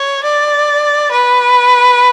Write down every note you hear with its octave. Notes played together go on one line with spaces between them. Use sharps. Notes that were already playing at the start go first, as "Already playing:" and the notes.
Already playing: C#5
D5
B4